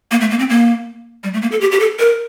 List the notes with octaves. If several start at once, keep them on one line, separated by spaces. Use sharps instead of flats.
A#3
A3
A#3
C4
A#3
G3
A3
A#3
A4
G4
G4
A4
A#4